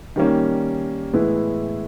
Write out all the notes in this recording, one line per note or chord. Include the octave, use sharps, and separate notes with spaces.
D#3 G3 A#3 C#4
A2 E3 G#3 B3 E4